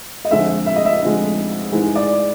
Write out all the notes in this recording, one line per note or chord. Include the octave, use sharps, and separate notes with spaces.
D#5
F2 D3 F3 G#3 E5
E5
D#5
E5
F2 D3 F3 G#3
G#2 E3 G#3
D5